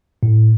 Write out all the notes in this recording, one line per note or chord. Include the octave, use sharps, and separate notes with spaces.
A2